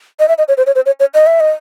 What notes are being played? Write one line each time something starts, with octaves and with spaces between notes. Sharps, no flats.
D#5
E5
D#5
C#5
C5
C#5
C5
C#5
C#5
D#5
E5
D#5